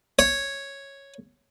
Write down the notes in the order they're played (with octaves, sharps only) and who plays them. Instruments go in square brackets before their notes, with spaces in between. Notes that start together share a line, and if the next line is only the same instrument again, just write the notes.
[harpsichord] C#5